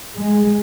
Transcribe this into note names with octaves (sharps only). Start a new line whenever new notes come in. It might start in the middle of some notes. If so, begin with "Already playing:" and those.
G#3